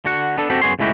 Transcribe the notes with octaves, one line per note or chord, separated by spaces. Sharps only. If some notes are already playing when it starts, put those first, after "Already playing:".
D3 F#4 F#5
B3 D4 A4
C4 F#4 G4 A4
F#2 B3 G#4 C#5 C6
C#2 A2 G#3 E4 F#4 G4